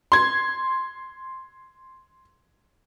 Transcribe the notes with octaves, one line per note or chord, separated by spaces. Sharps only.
C6 G#6